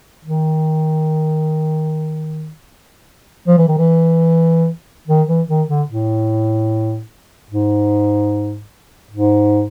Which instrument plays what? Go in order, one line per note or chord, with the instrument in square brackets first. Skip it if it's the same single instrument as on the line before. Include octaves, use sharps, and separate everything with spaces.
[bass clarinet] D#3
F3
E3
D#3
E3
D#3
E3
D#3
D3
A2
G#2
G#2